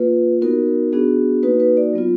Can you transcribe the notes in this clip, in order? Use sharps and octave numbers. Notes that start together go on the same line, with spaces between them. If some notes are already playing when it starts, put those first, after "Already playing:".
Already playing: A#3 F4 B4
B3 D#4 F#4 A#4
B3 D4 F#4 G#4
A#3 D#4 F#4 B4
B4
D5
F#3 B3 F4